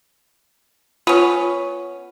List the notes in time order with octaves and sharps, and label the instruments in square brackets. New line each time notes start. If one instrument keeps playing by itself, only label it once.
[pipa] B3 C#4 [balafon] F4